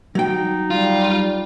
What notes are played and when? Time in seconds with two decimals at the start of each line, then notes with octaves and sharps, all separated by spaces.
0.15 F#3 D#4 G5
0.70 G3 F4